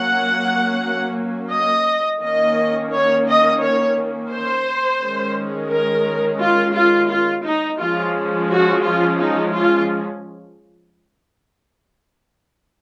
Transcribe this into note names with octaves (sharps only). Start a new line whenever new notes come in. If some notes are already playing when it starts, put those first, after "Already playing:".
Already playing: F#3 A#3 C#4 F#5
D#5
D#3 A#3 C#4 D#5
C#5
D#5
C#5
C5
D#3 G#3 C#4
A#4
F4
F4
F4
D#4
F3 G#3 C#4 F4
F#4
F4
D#4
F4